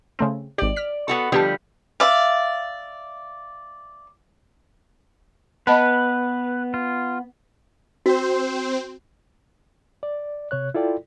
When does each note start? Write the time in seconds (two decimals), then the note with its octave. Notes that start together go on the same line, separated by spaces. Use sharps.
0.19 C#3 A3 C4
0.58 G#1 G4 D5
0.76 F6 B6
1.08 B3 F#4 A4
1.32 D3 F3 G3 B3 G4 A5
2.00 D5 E5 F5
5.67 B3 B4 D#5 A5 B5
6.74 F4
8.06 C4 F#4 C5
10.03 D5
10.51 C3 C#5 F#6
10.74 E4 F4 A4 D5 G5